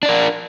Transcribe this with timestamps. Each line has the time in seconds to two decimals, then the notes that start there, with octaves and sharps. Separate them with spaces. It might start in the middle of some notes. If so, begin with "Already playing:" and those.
0.03 D4
0.06 D5
0.09 A#4